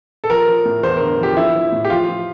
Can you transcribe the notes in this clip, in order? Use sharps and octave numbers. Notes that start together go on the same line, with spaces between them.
A4
F3 A#4
F3
A2
E2 C5
D3 A#4
F3 G4
F3 E4
F3
A2
G4
F3 F4
F3